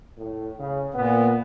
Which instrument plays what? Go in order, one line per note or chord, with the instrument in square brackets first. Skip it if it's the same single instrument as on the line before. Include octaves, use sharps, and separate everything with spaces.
[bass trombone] A2
C#3
[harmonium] A#2 [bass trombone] B3